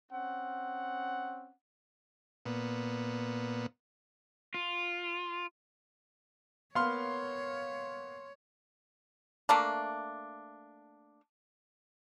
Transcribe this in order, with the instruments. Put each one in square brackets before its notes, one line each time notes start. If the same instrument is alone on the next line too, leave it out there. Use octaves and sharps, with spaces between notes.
[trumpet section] C4 C#4 F#5
[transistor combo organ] A#2 B3
[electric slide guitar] F4
[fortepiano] A#3 B3 [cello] C#5 [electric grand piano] F5 C6 F6
[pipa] A3 A#3 D4